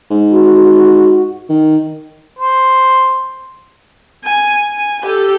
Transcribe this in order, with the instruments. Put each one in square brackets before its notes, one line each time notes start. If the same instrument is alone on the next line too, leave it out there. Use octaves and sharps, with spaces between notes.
[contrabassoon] G#2
[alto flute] F#4
[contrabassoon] D#3
[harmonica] C5
[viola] G#5
G#5
G4 A4